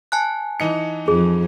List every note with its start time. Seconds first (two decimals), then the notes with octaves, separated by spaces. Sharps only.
0.12 G#5 A5 F#6
0.60 E3 D#4 C#7
1.08 F2 G#4